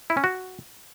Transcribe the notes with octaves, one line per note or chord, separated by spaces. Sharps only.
E4
C#4
F#4